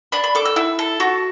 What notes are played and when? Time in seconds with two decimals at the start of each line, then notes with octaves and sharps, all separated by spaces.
0.12 D4 B5
0.24 B5
0.35 A4 D6
0.45 E6
0.56 E4 E6
0.79 A4
1.00 F#4